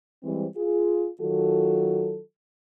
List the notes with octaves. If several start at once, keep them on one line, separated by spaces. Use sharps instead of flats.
E3 G3 G#3 C4
F4 G#4
D#3 F#3 F4 F#4 A4